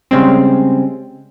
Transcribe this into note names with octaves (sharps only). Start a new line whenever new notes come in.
C#3 G3 G#3 C4